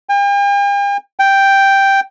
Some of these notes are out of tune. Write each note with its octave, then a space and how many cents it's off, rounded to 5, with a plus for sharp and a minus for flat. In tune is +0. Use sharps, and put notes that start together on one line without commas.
G5 +45
G5 +0